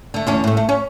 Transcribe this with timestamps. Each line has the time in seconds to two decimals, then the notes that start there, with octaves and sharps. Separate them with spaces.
0.14 D3 A3
0.27 E2 D3 C#4
0.44 A2 A3
0.57 A3
0.69 C#4